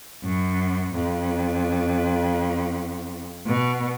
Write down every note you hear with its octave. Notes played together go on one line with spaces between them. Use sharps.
F#2
F2
B2